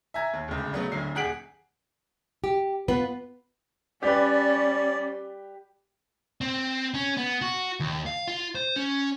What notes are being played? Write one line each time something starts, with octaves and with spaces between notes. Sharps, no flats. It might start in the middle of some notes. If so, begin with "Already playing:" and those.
E5 G#5 A#5 G#6
D#2
D1 C#2
C#3 F#3 A3 B3
D1 D2 F#3 C7
D#1 G#4 F#5 B6 D7 F#7
G4
B3 F4 B4
G3 C#4 G4 B4 D5
C4
C#4
B3
F#4
D#2
F5
F4
C5
C#4